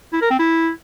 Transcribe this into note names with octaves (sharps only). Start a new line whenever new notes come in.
E4
A#4
C4
E4